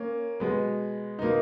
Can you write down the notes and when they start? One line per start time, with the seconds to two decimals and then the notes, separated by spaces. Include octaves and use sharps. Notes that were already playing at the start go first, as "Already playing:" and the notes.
Already playing: A#3 C#4
0.40 B2 G#3 B3
1.19 B2 A#3 D#4